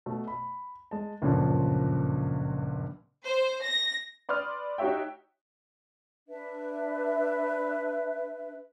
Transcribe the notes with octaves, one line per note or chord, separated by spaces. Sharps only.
B2 A3
B5
G#3 A5
G1 C#2 F#2 A#2 C#3 F3
C5
A#6
B4 D5 C6 D#6 F6
D#4 F#4 G4 C#5 E5 G5
D4 B4 E5